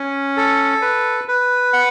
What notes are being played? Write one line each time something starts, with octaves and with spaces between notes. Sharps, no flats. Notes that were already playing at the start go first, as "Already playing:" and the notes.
Already playing: C#4
A4
B4
B4
F#5